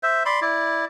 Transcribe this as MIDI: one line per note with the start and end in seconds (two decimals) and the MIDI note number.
0.03 0.23 72
0.03 0.23 76
0.26 0.40 74
0.26 0.40 83
0.26 0.40 84
0.42 0.85 64
0.42 0.85 74